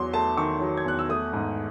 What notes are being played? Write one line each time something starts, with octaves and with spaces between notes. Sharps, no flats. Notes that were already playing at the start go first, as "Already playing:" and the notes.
Already playing: E2 F#3 C6
A3 A5
D#3 C#6
F#3
G#6
E2 F#6
E6
A3 D#6
G#2